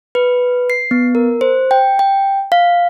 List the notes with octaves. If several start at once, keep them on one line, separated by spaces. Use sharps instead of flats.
B4
C7
B3
A#4
C5
G5
G5
F5